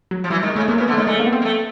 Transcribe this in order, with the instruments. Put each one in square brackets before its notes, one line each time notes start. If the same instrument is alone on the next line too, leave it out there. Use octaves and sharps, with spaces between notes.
[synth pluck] F#3
[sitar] F3
[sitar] E3 [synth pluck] G3
[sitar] D#3 [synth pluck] G#3
[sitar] C#3 [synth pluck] A3
[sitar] C3 [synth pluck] A#3
[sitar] C#3
[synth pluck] B3
[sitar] D3
[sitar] D#3 [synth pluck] A3
[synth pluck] G#3 [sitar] A3
[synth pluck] A#3
B3
C4
[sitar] A#3
A3